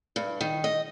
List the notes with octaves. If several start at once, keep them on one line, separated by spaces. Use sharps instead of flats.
G2
D#3
D#5